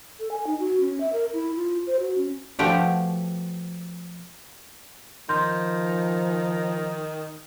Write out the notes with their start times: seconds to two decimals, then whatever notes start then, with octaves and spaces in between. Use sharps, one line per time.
0.20 A4
0.31 G#5
0.47 D#4
0.60 F#4
0.80 C#4
1.00 E5
1.13 A#4
1.33 E4
1.56 F4
1.87 C5
2.00 F#4
2.18 C#4
2.59 B2 F3 A3 G4 F#5
5.29 D#3 F3 C6 G6